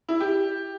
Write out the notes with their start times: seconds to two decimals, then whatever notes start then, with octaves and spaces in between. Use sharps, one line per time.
0.09 E4
0.20 G4